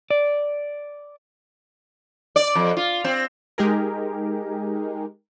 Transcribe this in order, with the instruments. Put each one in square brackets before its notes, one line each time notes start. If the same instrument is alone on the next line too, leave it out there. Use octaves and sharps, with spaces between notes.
[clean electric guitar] D5
[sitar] D5
F2
F4
C4
[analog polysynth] G#3 D#4 G4 G#4 A#4